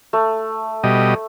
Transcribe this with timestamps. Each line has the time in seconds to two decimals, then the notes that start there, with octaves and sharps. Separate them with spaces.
0.13 A3
0.84 B2 G3 D#5